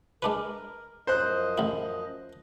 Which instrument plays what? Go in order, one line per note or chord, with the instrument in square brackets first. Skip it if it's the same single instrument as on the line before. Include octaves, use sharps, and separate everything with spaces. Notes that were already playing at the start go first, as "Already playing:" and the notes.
[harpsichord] G#3 D4 B4 [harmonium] A#4
[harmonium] F#2 F3 D#5 [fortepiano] C5 F#6
[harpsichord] A1 E4